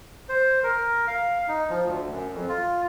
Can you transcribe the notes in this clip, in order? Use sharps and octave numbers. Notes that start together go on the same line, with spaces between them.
C5
A#4
F5
D#4
F3
D2
F#2
F2
F4